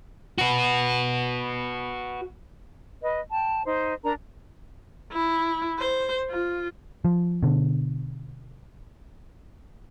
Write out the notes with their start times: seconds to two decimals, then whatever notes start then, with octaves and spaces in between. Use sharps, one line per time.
0.38 F#4 B4
3.03 B4 D#5
3.30 G5 A5
3.64 D#4 C5
4.04 D4 A#4 A#5
5.13 E4
5.79 C5
6.30 F4
7.05 F3
7.43 B2 D3